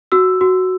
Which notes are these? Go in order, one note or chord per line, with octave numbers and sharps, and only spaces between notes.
F#4 E6
F#4